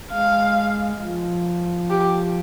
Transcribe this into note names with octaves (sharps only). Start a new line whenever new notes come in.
G#3 F5
F3
G4